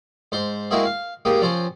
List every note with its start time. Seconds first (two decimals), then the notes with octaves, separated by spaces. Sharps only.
0.32 G#2 C5 C6
0.71 G#3 A#3 C4 E4 F#4 G#4
0.85 F5
1.25 G#2 A#3 G4 D#6
1.41 F3 C4 C#4